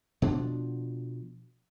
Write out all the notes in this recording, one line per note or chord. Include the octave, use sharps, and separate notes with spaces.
B2 F3 D4